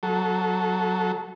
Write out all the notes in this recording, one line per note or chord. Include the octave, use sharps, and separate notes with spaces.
F#3 A4